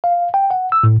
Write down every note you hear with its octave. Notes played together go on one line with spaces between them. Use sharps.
F5
G5
F#5
E6
A2